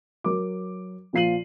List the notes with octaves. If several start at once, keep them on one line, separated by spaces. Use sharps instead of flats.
F#3 A#4 D6
A#2 F3 F4 C7 D#7 F#7